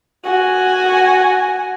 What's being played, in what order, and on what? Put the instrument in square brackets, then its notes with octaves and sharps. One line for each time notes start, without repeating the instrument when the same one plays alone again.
[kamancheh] F#4 G#5